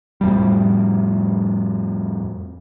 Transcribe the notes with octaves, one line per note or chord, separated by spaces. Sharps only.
F2 A2 G3